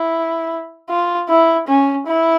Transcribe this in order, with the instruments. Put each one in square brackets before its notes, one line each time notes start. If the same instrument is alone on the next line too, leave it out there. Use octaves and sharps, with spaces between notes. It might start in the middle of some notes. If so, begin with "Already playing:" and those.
Already playing: [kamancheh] E4
F4
E4
C#4
E4